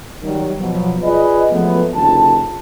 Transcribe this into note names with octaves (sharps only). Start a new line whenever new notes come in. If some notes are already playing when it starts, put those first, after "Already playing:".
D#3 F#3 G3
B2 F3 F#3
F4 G#4 B4 D5 D#5
F3 F#3 G#3 A3 B3
F#1 D3 D#3 F4 A5